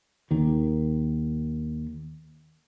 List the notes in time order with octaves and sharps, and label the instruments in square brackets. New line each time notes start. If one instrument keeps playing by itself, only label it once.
[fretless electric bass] D#2 D#3